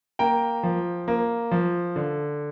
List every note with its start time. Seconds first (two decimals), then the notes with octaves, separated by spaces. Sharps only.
0.19 A#3 G5 A#5
0.63 F3
1.08 A#3
1.51 F3
1.96 D3